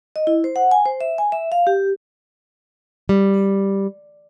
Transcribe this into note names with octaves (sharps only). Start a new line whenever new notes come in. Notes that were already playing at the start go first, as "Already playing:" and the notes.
D#5
E4
C5
F#5
G#5
C5
E5
G#5
E5
F5
G4
G3